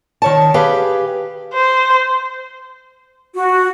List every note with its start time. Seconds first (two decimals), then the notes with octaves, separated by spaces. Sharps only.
0.22 D#3 C#5 A5
0.54 G4 G#4 B4 F5
1.54 C5
3.34 F#4